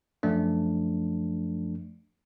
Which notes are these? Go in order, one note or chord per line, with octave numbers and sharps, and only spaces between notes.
F#2 F3 A3 D4